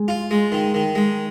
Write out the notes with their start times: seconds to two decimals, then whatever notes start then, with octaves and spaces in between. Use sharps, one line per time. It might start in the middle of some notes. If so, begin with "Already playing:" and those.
Already playing: G#3
0.08 F4
0.31 G#3
0.52 D#3
0.74 D#3
0.95 G#3